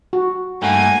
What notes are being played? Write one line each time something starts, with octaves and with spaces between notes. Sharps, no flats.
F#4
G2 A3 A#3 F#5 G#5